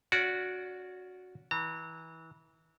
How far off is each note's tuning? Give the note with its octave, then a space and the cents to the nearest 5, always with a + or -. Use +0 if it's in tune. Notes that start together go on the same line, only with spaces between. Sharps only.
C#4 +15 F#4 -10 D5 -15
E3 -25 A#5 -35